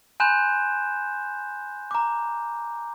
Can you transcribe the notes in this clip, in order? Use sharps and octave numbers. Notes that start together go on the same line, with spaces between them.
G#5 B5 C6 F#6 G6 E7
A#5 D6